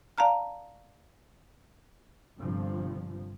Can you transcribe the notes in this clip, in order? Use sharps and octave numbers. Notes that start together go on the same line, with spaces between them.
D5 F5 A5 A#5 F6
G1 G2 C3 F3